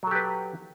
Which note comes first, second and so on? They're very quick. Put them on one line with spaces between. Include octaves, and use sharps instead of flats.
F#3 A4 G4 B4